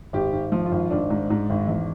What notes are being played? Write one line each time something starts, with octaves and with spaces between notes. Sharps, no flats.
G#1 G4
G#1
F3
F4
G#1
G#1 D4
G#2
G#2
G#1
E2